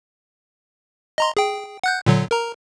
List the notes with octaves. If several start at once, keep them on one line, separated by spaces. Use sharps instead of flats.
D#5 A#5 C6
G#4 G5
F#5 F#6 G6
A#2 D3 F#3
A#4 A#5